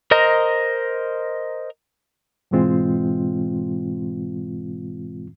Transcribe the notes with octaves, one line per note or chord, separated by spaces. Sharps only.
A#4 C5 D#5 A#5
G#2 B2 E3 G#3 C4 F4